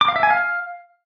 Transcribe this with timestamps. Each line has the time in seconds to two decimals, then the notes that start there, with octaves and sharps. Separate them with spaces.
0.01 D6
0.08 F5
0.16 E5
0.23 G#5
0.30 F5